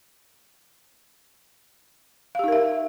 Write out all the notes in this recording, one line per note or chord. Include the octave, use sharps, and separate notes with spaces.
D#4 G4 A#4 E5 F5